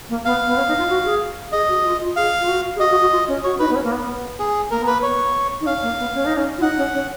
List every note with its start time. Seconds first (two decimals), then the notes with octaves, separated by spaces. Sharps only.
0.09 A#3
0.25 B3 F5
0.47 B3
0.57 C#4
0.68 D#4
0.78 F4
0.89 F#4
1.05 G#4
1.52 G#4 D#5
1.68 F#4
1.85 F4
2.00 F4
2.16 G#4 F5
2.40 F4
2.48 F#4
2.76 G#4
2.80 F#4 D#5
2.90 F#4
3.01 F#4
3.12 F4
3.28 C#4
3.44 F#4 C#5
3.59 D#4 B4
3.70 B3
3.75 C#4
3.84 A#3
3.91 B3
4.39 G#4
4.71 A#3 A#4
4.80 B3
4.87 A#3 B4
5.03 B3 C#5
5.61 D#4
5.66 C#4 F5
5.82 A#3
5.99 B3
6.14 C#4
6.26 D#4
6.37 C#4
6.58 F4
6.62 D#4 F#5
6.77 C#4
6.94 C#4